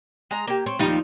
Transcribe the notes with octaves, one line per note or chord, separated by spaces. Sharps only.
G#3 A#5
A#3 G4
C4 C#5
D#2 F3 G3 D#4